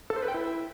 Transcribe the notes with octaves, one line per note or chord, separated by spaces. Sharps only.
A4
C5
B4
G5
E4